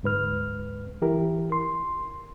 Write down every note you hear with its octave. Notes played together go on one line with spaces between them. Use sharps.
D2 G#2 B4 F6
E3 E4 G4 A#4
C6